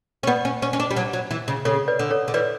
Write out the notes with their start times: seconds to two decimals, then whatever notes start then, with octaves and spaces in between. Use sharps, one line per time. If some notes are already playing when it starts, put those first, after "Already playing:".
0.23 C#4
0.27 B3 B4 D5
0.45 C#4
0.62 C#4
0.73 C#4
0.80 D4
0.91 G3
0.96 F#3
1.13 F#3
1.31 E3
1.48 C#3
1.65 C#3 A4 C#5
1.88 B4 D5
1.99 D3
2.11 A4 C#5
2.28 D3
2.34 E3 B4 D5